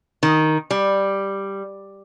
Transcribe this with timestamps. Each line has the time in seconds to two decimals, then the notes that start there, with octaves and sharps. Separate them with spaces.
0.23 D#3
0.71 G3